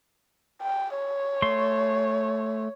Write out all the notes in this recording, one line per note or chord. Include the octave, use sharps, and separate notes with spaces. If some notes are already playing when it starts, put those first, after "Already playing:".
G5
C#5
A3 C6 C#6